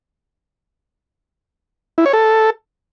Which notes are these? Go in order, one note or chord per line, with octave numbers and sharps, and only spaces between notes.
E4
C#5
A4